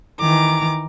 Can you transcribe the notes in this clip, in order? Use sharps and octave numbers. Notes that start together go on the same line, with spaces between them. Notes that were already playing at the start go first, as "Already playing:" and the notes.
D#3 E3 A#5 D6